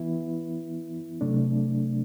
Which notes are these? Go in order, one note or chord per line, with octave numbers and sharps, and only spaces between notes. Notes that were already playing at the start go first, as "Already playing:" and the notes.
Already playing: E3 B3 E4
C3 F#3 A3 D4